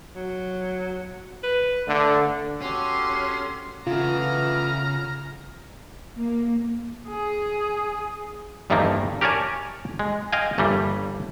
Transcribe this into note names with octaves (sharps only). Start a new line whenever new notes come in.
F#3
B4
D3 A3
C#4 F#4 G4 A4 C6
C#3 E3 A3 B3 F4 A#5 F6
A#3
G#4
E2 G2 D#3 F3 A3 A#3
G4 A#4 C#5 D5 G#5 A5
G#3
D#5 F5 G5 G#5
G1 G2 E3 G3 A#3